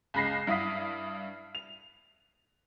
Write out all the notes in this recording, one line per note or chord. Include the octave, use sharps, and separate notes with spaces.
C#2 G#3 B5 A#6 C7
G2 E4 F5 D#6 B6
F7